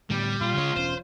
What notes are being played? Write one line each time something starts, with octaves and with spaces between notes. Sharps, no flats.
A2 D3 G3 B3
A#2 F4
C#3 G#3 C#5
E1 C#4 C5